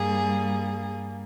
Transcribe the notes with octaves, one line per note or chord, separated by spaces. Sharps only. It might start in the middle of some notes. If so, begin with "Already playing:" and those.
Already playing: G2 G3 A#3 G#4